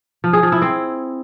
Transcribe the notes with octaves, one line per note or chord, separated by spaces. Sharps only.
F3
G#4
F3
E4
C4